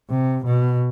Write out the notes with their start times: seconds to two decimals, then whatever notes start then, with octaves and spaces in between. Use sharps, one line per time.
0.10 C3
0.45 B2